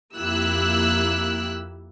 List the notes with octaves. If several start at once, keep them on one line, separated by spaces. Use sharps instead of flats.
F2 A#3 E4 G4 E6 F#6